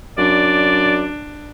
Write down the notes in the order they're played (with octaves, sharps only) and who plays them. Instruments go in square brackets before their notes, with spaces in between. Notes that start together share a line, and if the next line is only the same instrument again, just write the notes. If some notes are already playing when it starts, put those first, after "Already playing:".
[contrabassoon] F#2 [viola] D4 [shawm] D5